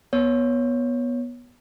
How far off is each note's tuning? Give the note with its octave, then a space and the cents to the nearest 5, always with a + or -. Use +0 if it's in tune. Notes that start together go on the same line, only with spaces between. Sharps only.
B3 -15 C#5 +0